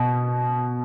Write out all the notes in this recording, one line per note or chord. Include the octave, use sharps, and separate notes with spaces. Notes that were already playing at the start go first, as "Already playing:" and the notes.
Already playing: B2